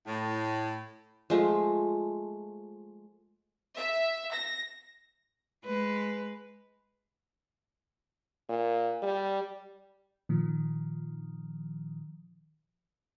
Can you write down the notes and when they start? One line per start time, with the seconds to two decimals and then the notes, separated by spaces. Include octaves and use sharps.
0.07 A2
1.30 F3 G#3 A3
3.75 E5
4.32 A#6
5.65 G#3 B4
8.49 A#2
9.03 G3
10.29 A#2 D#3 F3